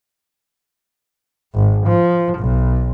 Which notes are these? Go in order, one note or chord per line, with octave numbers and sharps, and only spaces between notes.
G#1
F3
B1